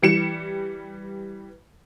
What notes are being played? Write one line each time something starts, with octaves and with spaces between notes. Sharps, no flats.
E3 G3 C#7 E7